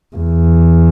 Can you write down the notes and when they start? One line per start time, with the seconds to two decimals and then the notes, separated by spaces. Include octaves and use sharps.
0.16 E2